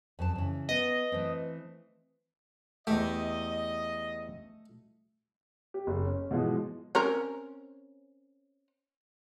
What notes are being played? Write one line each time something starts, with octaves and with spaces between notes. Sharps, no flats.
F2 C4 A5
C#3 E3
B3 B4 D#5
E3 A3 C4
E2 A3 G4 D#5
G4
F#1
C#4
B2 E3 F3 G#3
C4 C#4 A#4